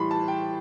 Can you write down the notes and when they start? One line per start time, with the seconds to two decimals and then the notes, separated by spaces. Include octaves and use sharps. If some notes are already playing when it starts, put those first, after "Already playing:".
Already playing: A2 E3 G3 B5 C6
0.11 A5
0.28 G5